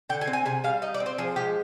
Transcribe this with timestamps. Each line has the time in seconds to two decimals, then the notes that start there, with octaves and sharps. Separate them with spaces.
0.09 D3 G5
0.21 G#5
0.27 C4
0.33 G#5
0.46 C3 G#5
0.64 G3 F5
0.82 D#4 D#5
0.94 D5
1.00 C4
1.06 C5
1.18 F3 G#4
1.36 G#3 G4